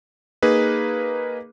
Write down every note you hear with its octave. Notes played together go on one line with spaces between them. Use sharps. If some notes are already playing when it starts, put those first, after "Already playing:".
A#3 D#4 G#4 B4